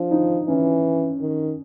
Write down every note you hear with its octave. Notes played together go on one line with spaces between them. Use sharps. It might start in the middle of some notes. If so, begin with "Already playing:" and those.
Already playing: F3 D4
D#4
E3 C#4
D#3